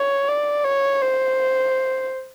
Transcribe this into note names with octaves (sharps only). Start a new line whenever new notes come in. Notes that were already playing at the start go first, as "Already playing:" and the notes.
Already playing: C#5
D5
C#5
C5